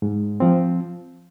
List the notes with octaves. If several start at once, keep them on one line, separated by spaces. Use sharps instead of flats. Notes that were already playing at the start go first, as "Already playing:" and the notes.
G#2
F3 C4